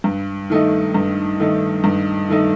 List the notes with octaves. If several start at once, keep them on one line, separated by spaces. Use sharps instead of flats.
G2
D#3 A3 D#4
G2
D#3 A3 D#4
G2
D#3 A3 D#4